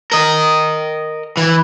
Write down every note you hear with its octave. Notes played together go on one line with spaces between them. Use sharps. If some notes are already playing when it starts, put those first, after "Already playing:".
A#4 D#5
E3